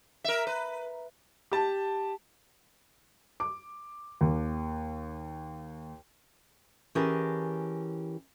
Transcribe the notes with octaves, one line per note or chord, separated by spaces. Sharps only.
A#4 E5
B4
G4 A5
D6
D#2
E3 C#4 G4 G#4 A#4 A5